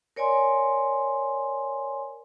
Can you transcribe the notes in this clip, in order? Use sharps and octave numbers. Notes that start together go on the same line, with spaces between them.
A#4 C#5 D5 G#5 C6